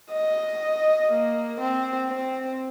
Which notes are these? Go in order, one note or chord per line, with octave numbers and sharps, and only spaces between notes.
D#5
A#3
C4
C4